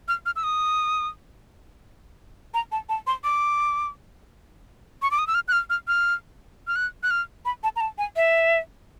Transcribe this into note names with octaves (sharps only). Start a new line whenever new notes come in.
F6
F6
E6
D#6
A#5
A5
A5
C6
D6
C#6
D6
D#6
E6
F6
F#6
F6
F6
F6
F6
F#6
F#6
F6
B5
A5
A#5
A5
G#5
E5